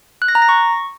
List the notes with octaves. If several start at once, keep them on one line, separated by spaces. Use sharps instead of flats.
F#6
A#6
A#5
A#6
C#6